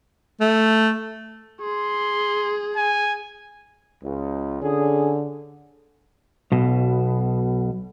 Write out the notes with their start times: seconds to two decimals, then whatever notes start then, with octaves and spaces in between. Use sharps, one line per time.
0.40 A3
1.61 G#4 C6
2.77 G#5
4.03 C#2
4.62 D3 C#4 G#4
6.52 B1 B2